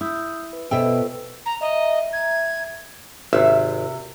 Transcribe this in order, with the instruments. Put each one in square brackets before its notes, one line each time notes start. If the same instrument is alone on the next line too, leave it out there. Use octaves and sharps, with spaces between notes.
[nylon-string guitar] E4 [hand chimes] D#6 E6 G6
[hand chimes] B4
[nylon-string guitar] B2 E5 G5 [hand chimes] A4 C5 E6
[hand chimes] F4 A4 B4
[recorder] A#5
[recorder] D#5 [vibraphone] E5 A#5
[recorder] G#6
[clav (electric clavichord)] G#1 [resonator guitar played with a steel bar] C3 E5